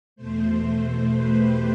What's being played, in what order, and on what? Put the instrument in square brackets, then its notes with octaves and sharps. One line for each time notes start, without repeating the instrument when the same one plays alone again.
[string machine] E2 B2 A3 C5
B4
G4